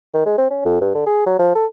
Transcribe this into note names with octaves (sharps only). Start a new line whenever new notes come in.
D#3
G#3
C4
C#4
F2
G2
D3
G#4
F#3
F3
A4